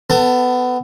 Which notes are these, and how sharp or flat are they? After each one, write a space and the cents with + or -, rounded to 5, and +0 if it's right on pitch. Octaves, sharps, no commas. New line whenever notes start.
B3 +20 A4 +20 A5 +35